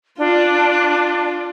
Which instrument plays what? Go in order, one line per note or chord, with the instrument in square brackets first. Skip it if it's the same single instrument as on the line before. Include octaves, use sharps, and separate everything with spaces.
[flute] D4 [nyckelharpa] F4